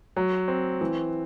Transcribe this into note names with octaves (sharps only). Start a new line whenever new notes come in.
F#3
C4
E3